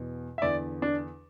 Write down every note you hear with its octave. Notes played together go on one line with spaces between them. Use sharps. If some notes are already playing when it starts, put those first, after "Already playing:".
Already playing: E2 B2
E5
E2 D3 D5
D4